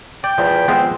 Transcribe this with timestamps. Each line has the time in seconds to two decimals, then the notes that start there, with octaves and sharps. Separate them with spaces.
0.24 D5 G5
0.38 E2 F3
0.68 F3 G#3 B3 C4